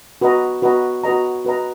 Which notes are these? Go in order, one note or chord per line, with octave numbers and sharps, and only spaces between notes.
F#4 B4 D#5 A#5
F#4 B4 D#5 A#5
F#4 B4 D#5 A#5
F#4 B4 D#5 A#5